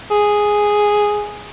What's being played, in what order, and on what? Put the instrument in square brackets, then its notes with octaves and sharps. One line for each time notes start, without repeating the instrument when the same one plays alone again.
[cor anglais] G#4